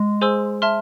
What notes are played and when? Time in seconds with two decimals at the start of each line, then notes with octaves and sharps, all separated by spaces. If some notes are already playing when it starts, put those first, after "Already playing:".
Already playing: G#3
0.21 G#4 C5 G#5 C6 E6
0.62 E5 A5 C6 F6